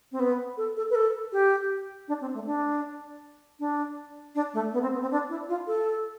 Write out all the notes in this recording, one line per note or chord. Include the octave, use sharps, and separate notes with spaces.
C4
B3
A4
A4
B4
A4
G4
D4
C4
A3
D4
D4
D4
A3
B3
C4
B3
C4
D4
E4
F4
A4